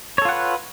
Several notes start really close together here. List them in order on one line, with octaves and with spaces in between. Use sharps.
C#5 A4 F4 F#5 B4